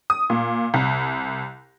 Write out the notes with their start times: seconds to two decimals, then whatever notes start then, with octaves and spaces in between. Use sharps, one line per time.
0.10 D#6
0.30 A#2
0.74 C2